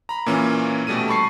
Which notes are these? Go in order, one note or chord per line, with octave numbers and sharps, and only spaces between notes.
A#5 B5
A#2 E3 A#3 C#4
B2 G3 A3 D#7
A5 B5 C#6 C7